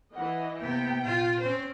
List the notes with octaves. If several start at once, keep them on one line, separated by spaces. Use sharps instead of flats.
E3 D#5 F#5
C3 A#3 B3 G5
A#2 F4
C4 C#4 C5